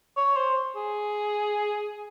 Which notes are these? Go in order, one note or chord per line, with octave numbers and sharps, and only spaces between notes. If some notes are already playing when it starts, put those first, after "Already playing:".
C#5
C5
G#4